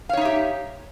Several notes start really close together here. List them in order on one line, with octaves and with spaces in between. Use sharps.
F5 C#5 D#4 E5 G4